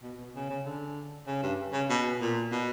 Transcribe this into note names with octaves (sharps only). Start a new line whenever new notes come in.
B2
B2
C#3
C#3
D3
C#3
G2
C#3
B2
A#2
B2